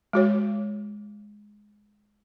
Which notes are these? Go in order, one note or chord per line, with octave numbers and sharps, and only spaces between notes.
G#3 F#4 C#5